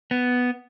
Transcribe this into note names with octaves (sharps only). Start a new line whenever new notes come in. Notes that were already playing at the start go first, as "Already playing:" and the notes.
B3